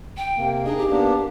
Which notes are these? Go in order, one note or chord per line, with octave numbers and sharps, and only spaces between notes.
G5
C3 A#3
D4 D#4 G#4 D#5
G4
A#3 B3 D4